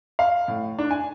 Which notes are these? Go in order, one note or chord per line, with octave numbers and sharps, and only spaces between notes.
F5
A2
D4
G#5